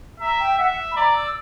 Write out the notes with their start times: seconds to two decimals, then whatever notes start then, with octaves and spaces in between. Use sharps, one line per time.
0.20 E5 A#5
0.40 G5
0.58 E5 F#5
0.91 B5
0.96 D5 A#5
1.14 E6